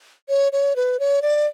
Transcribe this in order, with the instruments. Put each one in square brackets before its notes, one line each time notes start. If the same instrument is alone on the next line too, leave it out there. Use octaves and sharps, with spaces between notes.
[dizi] C#5
C#5
B4
C#5
D5